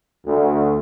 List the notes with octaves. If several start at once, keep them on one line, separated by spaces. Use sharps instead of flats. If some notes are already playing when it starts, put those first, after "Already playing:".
D2